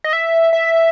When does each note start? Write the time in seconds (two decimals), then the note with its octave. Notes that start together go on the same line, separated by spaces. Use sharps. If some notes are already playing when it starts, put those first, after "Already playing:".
0.04 D#5
0.13 E5
0.53 E5